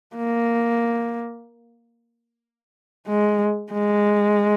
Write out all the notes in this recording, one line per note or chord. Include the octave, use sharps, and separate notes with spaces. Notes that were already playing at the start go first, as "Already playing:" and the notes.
A#3
G#3
G#3